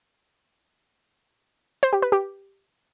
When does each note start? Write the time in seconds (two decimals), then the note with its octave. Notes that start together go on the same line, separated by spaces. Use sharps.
1.83 C5
1.93 G4
2.02 B4
2.12 G4